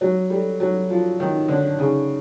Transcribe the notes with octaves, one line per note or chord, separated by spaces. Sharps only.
F#3 C#5
G3 A4
F#3 C#5
F3 F#4
D#3 C#5
D3 C#5
C#3 D#4